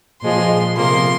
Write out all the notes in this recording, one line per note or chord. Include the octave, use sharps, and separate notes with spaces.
A#2 F3 G#3 C6
C3 F3 A#3 C6